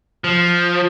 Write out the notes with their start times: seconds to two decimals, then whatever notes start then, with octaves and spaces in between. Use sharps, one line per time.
0.24 F3